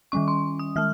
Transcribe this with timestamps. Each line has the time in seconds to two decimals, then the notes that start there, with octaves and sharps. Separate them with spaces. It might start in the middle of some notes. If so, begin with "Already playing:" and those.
0.12 D#3 G3 C#4 C#6
0.28 C6
0.59 D#6
0.76 D#3 G#3 F6